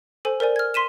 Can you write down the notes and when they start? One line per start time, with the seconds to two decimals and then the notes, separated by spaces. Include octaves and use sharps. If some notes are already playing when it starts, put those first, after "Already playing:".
0.25 A4 C5 G#5
0.40 A#4 C5 D5 G#5
0.56 F6 G#6
0.74 C6 B6 D#7 E7